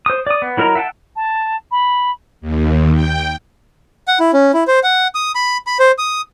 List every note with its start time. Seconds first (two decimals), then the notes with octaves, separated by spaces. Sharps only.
0.06 C5 D#6
0.27 D5 D#6
0.42 B3
0.57 F#3 E4 A#4 D#5 A#5
0.75 E5 F#5 G5 A5
1.16 A5
1.71 B5
2.41 D#2
2.94 G5
4.08 F#5
4.20 E4
4.33 C#4
4.54 E4
4.67 C5
4.83 F#5
5.15 D#6
5.35 B5
5.67 B5
5.79 C5
5.98 D#6